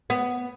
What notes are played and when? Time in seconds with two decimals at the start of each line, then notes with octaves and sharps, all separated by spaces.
0.10 B3